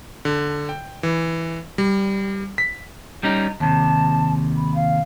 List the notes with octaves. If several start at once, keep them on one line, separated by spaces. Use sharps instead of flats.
D3
G5
E3
G3
B6
G3 C#4 D#4 A#5
D#2 C3 A5
B5
F5